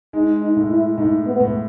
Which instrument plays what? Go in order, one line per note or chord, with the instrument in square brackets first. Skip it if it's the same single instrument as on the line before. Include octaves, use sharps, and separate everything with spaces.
[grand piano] G#3 [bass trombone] D#4
[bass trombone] D#4
[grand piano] A2
[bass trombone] E4
[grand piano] A2 [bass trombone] D#4
[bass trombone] B3
[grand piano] A2